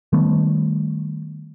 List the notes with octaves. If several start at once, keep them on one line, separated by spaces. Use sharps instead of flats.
D#3 G3 A3 B3